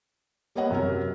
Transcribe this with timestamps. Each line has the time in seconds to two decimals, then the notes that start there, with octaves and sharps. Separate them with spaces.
0.55 G3 A#3 B3 C#5 D#5 F#5
0.70 F#2 C3 F#3 A#4